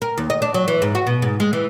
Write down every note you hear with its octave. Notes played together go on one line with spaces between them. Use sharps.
A#4
D#2
D#5
D4
F#3
E3
G#2
F#4
B2
G#2
G#3
E3